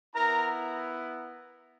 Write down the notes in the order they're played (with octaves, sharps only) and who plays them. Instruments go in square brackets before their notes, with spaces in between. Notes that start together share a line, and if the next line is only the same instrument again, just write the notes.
[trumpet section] B3 E4 A#4 A#5